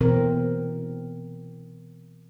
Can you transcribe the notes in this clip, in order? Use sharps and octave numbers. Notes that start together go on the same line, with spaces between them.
B2 E3 C4 A#4